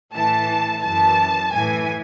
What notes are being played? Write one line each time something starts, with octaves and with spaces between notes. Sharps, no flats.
A2 E3 A5
F#2 E3 A5
A2 E3 G#5